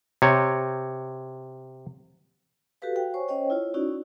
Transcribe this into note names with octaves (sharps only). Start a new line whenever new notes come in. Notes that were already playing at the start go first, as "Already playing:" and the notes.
C3 C#5
F#4 G4 A4 B4 F5
F#4 F5 G5
C5 C#5 G#5 C#6
C#4 C5 C#5 D#5 G5
E4 F4 C#5
C#4 D#4 E4 F#4 D5